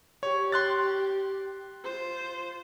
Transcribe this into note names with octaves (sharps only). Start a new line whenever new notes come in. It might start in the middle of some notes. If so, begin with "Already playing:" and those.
G4 C#5
C6 F#6 A6
F4 C5